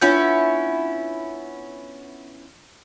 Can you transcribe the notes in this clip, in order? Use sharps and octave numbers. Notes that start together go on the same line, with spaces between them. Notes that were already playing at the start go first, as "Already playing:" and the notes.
B3 C#4 D4 E4 F4 G6